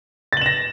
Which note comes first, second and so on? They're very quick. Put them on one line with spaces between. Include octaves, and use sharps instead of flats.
A6 F#7 E7 A#6